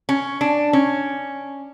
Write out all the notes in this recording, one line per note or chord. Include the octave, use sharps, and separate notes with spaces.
C#4
D4
C#4